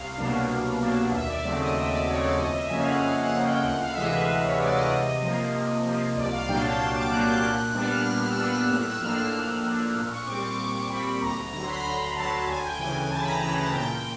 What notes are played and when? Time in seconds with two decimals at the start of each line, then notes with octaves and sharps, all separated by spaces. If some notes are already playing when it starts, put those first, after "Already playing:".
Already playing: C2 F5
0.17 B2 F#3 A#3 D4
0.49 C2
0.80 B2 F#3 A#3 D4
1.12 D#2 E5
1.27 D5
1.44 C#3 F#3 A3 C4 D5
1.59 D#5
1.75 D#2 E5
1.91 D5
2.06 C#3 F#3 A3 C4 C#5
2.23 D5
2.38 F2 D#5
2.54 E5
2.70 C#3 F3 A#3 C#4 G#5
2.78 F5
2.85 F#5
3.01 F2 F5
3.23 F#5
3.33 C#3 F3 A#3 C#4
3.44 G5
3.64 D2 F#5
3.80 F5
3.92 E5
3.96 C3 E3 G#3 D#5
4.12 B4
4.28 D2 B4
4.43 C#5
4.59 C3 E3 G#3 D5
4.75 D#5
4.91 C3
5.22 F3 A#3
5.53 C3
5.85 F3 A#3
6.17 C2 D5
6.32 F5
6.48 A#2 F#3 A#3 D4 G5
6.64 A5
6.80 C2 A5
6.95 D6
7.11 A#2 F#3 A#3 D4 F#6
7.27 G6
7.43 A#2 F#6
7.59 F#6
7.74 G3 B3 D4 F#6
7.90 F6
8.06 A#2 F#6
8.22 F6
8.30 E6
8.37 G3 B3 D4 F6
8.53 F#6
8.69 A2 F#6
8.85 E6
9.01 F3 A#3 D4 F6
9.16 F#6
9.32 A2
9.64 F3 A#3 D4
9.95 A#2
10.11 C#6
10.27 G3 C4 D6
10.43 C#6
10.58 A#2 D6
10.74 C#6
10.90 G3 C4 B5
11.21 D2 A#5
11.53 D3 F#3 A#5
11.64 C6
11.69 B5
11.84 D2 A#5
12.16 D3 F#3 A5
12.47 D2 G#5
12.63 G5
12.79 C#3 E3 G#5
12.95 G#5
13.10 D2 A5
13.20 B5
13.26 A#5
13.42 C#3 E3 A#5
13.58 A5
13.73 A#2 G5